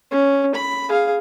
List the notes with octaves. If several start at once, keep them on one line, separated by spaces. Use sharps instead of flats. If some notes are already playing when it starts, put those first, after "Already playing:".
C#4
B5
G#4 F5